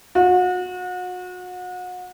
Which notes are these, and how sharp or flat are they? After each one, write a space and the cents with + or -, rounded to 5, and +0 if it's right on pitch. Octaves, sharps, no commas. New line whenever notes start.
F#4 -35